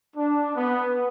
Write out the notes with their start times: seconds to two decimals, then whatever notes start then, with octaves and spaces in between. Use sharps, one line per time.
0.16 D4
0.56 B3